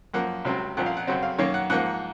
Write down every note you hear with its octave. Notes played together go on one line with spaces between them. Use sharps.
F#2 F3 A#3 F#5
C#2 C3 F#3 C4
C2 A#2 F3 F#5
F5
F#5
F#2 C#3 F#3 C4 F#5
F5
F#2 D#3 A#3 C#5
F#5
G#2 F3 A#3 F#5